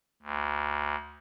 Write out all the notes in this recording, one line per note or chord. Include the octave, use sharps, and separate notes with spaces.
D2